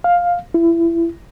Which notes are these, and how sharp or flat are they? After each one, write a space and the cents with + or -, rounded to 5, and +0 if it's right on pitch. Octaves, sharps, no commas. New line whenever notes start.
F5 +10
E4 +25